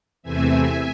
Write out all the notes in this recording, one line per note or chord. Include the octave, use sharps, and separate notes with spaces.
E2 C3 E3 A3 C4 E5 G#5